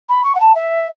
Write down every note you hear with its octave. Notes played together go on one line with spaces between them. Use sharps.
B5
C#6
F#5
A5
E5